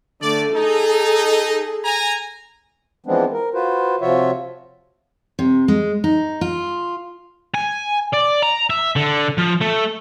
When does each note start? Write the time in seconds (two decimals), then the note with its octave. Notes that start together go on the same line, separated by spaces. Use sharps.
0.22 D3 A3 D5
0.55 D#4 G#4 A4
1.85 G#5 A#5
3.06 E3 F3 G#3 B3 C4 D4
3.32 A#4
3.54 F4 F#4 B4 C5
4.01 C3 F3 F4 F#4 C#5 E5
5.39 C3
5.68 G#3
6.04 D#4
6.41 F4
7.54 G#5
8.13 D5
8.42 A#5
8.70 E5
8.96 D3
9.38 F3
9.61 A3